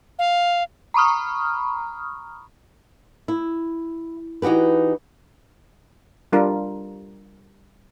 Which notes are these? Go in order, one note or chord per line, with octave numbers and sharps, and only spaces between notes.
F5
A#5 B5 C#6 D#6 F6
E4
E3 D#4 F#4 G4 B4
G3 D4 F4 A#4